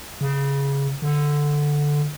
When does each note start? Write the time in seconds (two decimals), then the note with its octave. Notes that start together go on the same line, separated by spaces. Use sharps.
0.21 C#3
1.02 D3